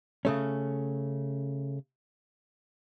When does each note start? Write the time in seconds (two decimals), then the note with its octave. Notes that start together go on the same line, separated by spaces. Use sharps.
0.25 C#3 A3 C#4